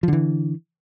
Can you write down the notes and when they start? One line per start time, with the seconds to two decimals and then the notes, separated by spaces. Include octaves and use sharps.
0.03 F3
0.08 D3
0.13 E3